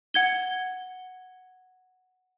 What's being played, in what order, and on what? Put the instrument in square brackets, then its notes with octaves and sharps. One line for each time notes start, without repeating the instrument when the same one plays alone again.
[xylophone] F#5 G#6 G7